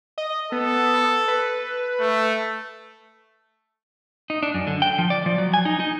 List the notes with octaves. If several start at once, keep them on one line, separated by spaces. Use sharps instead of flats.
D#5
B3 A4
B4
A3
D#4
D4
F#2
D3
G5
F3
D5
F3
F#3
G#5
D#4
D#4